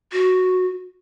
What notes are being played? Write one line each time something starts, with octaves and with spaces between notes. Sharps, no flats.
F#4